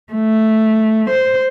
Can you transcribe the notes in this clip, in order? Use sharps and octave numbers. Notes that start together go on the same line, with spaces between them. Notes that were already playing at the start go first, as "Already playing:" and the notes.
A3
C5